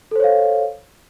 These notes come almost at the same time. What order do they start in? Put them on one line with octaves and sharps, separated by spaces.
A4 C5 C#5 F5